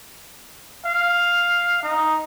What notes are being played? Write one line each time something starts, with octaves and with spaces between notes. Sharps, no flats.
F5
D#4